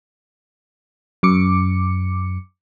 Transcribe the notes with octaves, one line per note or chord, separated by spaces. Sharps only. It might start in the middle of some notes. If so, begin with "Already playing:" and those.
F#2 D6 C#7